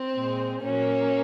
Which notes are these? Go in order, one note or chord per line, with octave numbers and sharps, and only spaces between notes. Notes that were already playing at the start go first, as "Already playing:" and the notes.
Already playing: C4
A#2 G#3
A#2 F#3 A#3 C#4